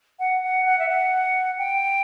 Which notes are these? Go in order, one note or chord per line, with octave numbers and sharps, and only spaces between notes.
F#5
F#5
F#5
E5
F#5
G5